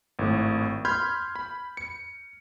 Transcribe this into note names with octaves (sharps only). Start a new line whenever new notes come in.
G#1 A2
B5 C6 F6 G6 G#6
B5
C#7